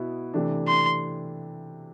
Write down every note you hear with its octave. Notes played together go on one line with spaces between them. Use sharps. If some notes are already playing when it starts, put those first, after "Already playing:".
Already playing: B2 B3 E4
C3 E3 A3 D4
C6